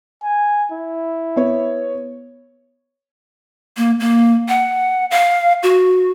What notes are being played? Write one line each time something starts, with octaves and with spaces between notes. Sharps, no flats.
G#5
E4
B3 C#5
A#3
A#3
F#5
F5
F#4